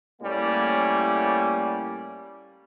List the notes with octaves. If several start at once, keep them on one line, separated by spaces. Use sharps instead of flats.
A2 G3 A#3 C#4